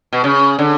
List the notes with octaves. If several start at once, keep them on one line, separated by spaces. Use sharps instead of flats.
B2
C#3
D3